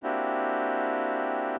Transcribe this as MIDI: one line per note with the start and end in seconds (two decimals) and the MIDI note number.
0.03 1.56 58
0.03 1.56 60
0.03 1.56 62
0.03 1.56 64
0.03 1.56 66
0.03 1.56 67